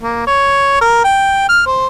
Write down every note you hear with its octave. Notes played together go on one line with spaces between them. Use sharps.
A#3
C#5
A#4
G5
F6
C5